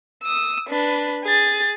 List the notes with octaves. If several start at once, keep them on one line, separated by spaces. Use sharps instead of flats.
D#6 E6
D4 B4
G#4 A6